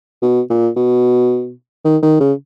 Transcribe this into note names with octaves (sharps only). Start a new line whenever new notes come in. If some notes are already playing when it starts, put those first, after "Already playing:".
B2
A#2
B2
D#3
D#3
C#3